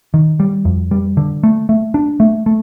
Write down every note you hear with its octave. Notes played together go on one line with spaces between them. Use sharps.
D#3
G3
F2
G3
D3
A3
A3
D4
A3
A3